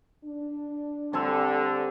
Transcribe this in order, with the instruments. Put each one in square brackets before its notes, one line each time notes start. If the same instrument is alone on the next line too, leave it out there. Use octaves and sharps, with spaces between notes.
[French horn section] D4
[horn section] D3 [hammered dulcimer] G3 C4 [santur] A3 G#5 E6